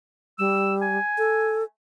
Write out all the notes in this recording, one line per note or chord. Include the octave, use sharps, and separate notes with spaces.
G3 E6
G#5
A4